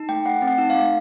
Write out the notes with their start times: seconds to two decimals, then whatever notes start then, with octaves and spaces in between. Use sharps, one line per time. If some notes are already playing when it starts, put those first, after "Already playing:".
Already playing: D#4
0.09 A3 G5
0.25 A3 F#5
0.42 C4
0.47 F#5
0.58 D#4
0.70 A3 F5